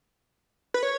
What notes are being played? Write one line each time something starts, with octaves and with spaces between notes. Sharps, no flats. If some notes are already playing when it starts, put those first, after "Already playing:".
B4
C#5